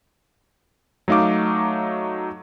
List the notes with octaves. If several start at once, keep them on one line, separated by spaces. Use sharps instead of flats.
F#3 A3 D#4 F5 D6